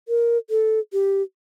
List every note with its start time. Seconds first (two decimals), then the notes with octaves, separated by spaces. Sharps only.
0.08 A#4
0.50 A4
0.93 G4